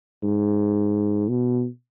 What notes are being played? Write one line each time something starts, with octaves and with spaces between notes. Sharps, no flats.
G#2
B2